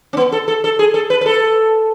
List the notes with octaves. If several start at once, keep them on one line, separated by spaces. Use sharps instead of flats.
C#4
B3
A4
A4
A4
G#4
A4
B4
B4
A4